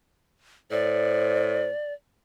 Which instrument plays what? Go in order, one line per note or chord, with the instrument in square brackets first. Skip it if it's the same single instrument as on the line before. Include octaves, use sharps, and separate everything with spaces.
[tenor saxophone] A2 [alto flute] C5 [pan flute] D5